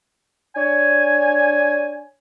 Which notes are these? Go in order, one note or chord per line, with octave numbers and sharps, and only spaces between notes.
D4 C#5 G#5